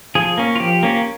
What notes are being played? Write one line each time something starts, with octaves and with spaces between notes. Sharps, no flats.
F3 G#4
A#3 C#4
F4
F3 G4
A#3 C#4